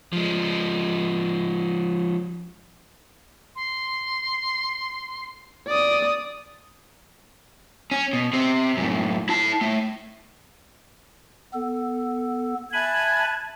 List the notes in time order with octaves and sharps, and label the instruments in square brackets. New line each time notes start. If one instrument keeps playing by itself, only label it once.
[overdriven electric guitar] F3 G#3
[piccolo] C6
[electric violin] D5 D#6
[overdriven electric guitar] C#4
B2
C3 C4
F#2 A2
E4 A5
A2 A3
[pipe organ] B3 A4
[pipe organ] E5 G#5 B5 [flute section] A5 F#6 G#6